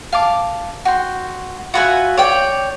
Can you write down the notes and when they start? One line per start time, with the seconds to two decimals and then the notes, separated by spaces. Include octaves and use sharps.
0.12 F5 A5 D6
0.85 F#4 G5 C6
1.74 F4 F#4 B4 E5 G#5
2.18 C#5 D5 G5